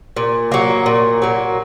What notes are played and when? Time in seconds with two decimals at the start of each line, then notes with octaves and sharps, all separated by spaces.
0.16 A#2
0.52 F#3 A#3
0.86 A#2
1.22 F#3 A#3